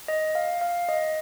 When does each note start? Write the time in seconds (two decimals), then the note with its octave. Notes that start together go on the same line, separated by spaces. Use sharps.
0.08 D#5
0.35 F5
0.61 F5
0.89 D#5